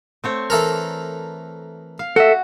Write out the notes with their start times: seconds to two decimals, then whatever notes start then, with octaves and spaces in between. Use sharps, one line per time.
0.24 A3 C4 C#5
0.50 E3 A4 A#4
1.99 F5
2.16 F#4 A4 E5